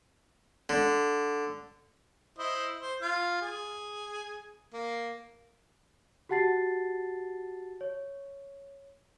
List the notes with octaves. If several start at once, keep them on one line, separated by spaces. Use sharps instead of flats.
D3
E4 C5 D#5
C5
F4 F5
G#4
A#3
F#4 G4 F#5 A5 A6 C7
C#5